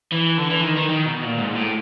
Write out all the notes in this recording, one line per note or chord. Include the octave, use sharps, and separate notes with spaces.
E3
D3
E3
D#3
D#3
D#3
B2
A#2
G#2
A2